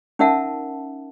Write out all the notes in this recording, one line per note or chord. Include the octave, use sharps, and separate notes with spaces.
C#4 D#4 A#4 E5 F#5 A5